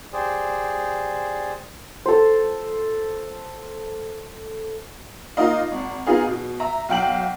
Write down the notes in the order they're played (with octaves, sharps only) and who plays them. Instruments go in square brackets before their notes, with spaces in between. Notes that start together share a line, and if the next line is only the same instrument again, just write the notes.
[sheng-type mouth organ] G4 G#4 C5 D5
[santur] A4 C5
[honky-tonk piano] A#3 D#4 F4 D#5 F5
G#1
B3 D#4 F4 G#4
B2
E5 A#5
B1 F5 G5 F#7